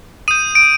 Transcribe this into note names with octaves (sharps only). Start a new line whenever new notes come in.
D#6 G6 D#7
D7